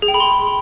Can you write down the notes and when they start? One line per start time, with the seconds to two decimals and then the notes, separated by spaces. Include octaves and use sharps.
0.02 G#4
0.08 G5
0.14 B5
0.20 C6